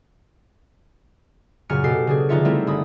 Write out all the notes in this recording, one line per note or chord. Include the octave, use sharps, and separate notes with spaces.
F#2 A#2 C#3 G#5 F6 C#7
B2 G4 A4 C7
C#3 D4 G#4
F1 D3 D#4 F4 E5 C#7
G3 A3 C4 E4 A#4
G1 B5 D#6